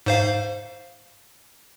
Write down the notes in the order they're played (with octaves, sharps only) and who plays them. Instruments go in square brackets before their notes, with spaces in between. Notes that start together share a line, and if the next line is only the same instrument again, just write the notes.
[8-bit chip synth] G#2 C5 F5